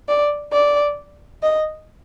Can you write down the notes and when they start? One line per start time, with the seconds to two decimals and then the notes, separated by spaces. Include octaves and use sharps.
0.09 D5
0.53 D5
1.42 D#5